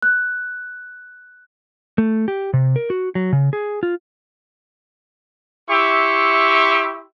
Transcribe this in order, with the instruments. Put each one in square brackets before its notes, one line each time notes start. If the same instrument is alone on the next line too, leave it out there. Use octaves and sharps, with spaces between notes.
[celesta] F#6
[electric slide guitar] A3
G4
C3
A#4
F#4
F#3
C#3
G#4
F4
[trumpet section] E4 G4 E5 C6 C#6